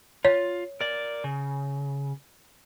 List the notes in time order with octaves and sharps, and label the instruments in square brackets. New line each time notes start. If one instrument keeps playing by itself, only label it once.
[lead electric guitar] F4 [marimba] C#5
[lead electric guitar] A#4 D5
C#3